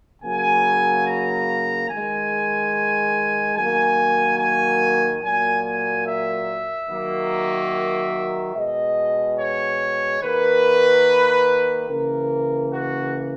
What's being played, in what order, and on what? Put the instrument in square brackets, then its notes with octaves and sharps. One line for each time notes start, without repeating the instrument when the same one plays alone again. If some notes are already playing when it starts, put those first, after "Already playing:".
[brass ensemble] C#3 F#3 A#3 G#5
A#5
D#3 G#3 G#5
D#3 F#3 A#3 G#5
G#5
A#2 F#3 A#3 G#5
G#5
E5
D#3 F#3 A#3
B2 G#3 D#5
C#5
D#3 A#3 B4
C#3 E3 A#3 A#4
F#4